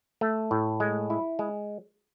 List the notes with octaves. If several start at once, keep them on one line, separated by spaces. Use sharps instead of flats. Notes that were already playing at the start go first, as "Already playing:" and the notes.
A3
A2
G#3
E4
G#3